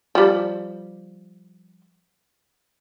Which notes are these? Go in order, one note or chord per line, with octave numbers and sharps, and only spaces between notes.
F3 G3